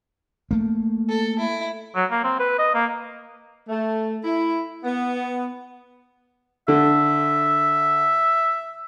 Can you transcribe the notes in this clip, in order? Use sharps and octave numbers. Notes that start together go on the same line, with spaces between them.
A3 A#3
A4
E4
F#3
A#3
C4
B4
D#5
A#3
A3
E4
B3
D3 E5